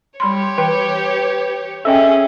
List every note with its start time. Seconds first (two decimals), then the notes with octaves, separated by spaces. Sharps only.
0.20 G3 G4 C#5 B5 C6
0.58 E3 B4 G5
1.85 C#4 G#4 A4 D#5 E5 G5